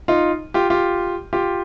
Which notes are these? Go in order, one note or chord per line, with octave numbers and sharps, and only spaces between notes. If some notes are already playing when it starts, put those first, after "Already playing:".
D#4 F4
F4 G4
F4 G4
F4 G4